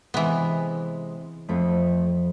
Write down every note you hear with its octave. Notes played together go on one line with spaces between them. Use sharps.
C3 E3 G#3 B3 C5
F2 F3 A3 C4